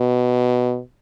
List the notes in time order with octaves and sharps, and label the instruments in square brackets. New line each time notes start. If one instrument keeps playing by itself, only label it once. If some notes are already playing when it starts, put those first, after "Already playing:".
Already playing: [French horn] B2